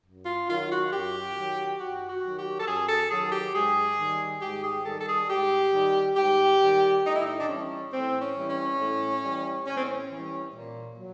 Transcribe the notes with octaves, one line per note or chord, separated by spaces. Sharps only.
F#2
F4
D#3 F#3 F4
F#4
F#2 G4
D#3 F#3
F#2 F#4
F#4
D#3 F#3
G4
A4
F#2 G#4
A4
D#3 F#3 G#4
G4
G#2 G#4
D#3 G3
G#2 G4
G#4
D#3 G3 A4
A4
G#4
G#2 G4
D#3 G3
G#2 G4
D#3 G3
A2 D#4
E4
D#4
D4
E3 G3 C#4
A2 C4
C#4
E3 G3
C#4
A2
E3 G3
A2 C#4
C4
C#4
E3 G3
A#2
F#3